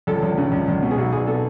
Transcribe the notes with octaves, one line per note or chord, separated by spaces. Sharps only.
C#2 A4
C#2
C#3
C#2
C#2
B2
G#4
B1 F#4
B1 G#4
B2 A4